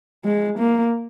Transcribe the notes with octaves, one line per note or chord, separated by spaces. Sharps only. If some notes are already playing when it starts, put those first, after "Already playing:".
G#3
A#3